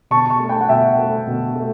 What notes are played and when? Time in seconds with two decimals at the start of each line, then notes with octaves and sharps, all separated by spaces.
0.11 B2 A5 C#6
0.30 A5 C#6
0.40 A3
0.49 G5 B5
0.61 F#5
0.69 B2 E5 G5
0.98 A3
1.27 B2
1.55 A3